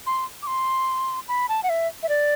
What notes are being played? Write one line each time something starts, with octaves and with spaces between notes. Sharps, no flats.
C6
D6
C6
B5
A5
F#5
E5
E5
D5